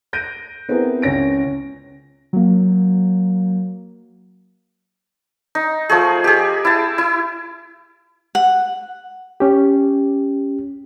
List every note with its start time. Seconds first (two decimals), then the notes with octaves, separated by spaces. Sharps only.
0.13 F#6 G6 A#6 D7 D#7
0.69 B3 C4 E4 G#4 A#4 B4
1.02 C#2 C#4 A#6 D7
2.33 F#3 A#3
5.55 D#4
5.89 F3 A3 G#4
6.24 G4 G#4
6.65 E4 A5
6.98 E4
8.35 F#5
9.40 C#4 G4